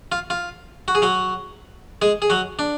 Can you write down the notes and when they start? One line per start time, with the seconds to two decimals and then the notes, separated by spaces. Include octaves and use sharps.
0.12 F4
0.30 F4
0.88 F#4
0.95 G#4
1.02 F#3 F#4
2.02 G#3 G#4
2.22 G#4
2.30 F#3 F#4
2.59 D4